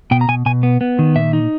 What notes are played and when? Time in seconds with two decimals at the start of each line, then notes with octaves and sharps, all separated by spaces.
0.11 B2 G5
0.21 A#5
0.28 B2 G#5
0.46 B2 G#5
0.63 B3
0.81 B3
0.99 D#3
1.16 A#2 E5
1.33 D#4